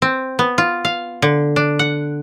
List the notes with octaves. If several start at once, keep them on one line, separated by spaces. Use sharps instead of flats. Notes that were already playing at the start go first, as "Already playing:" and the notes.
C4
B3
F4
F5
D3
D4
F#5